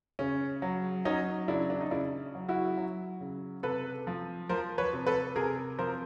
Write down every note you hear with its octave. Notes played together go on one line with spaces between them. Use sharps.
C#3 C#4
F#3
F#3 C#4 D#4
C#3 D4 E4
D4
D#4
C#3 D4 E4
F#3
E4 F#4
F#3
C#3
C3 A4 B4
F3
F3 A#4 C5
B4 C#5
C3
A4 B4
C3 G#4 A#4
F3 A#4 C5